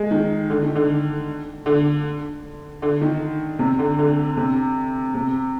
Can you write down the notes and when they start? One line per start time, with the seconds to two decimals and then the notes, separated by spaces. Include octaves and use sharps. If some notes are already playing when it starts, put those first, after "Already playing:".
Already playing: G#3
0.11 D#3
0.50 D3
0.62 D#3
0.75 D3
1.66 D3
2.82 D3
3.01 D#3
3.59 C3
3.79 D3
3.99 D3
4.37 C3
5.14 C3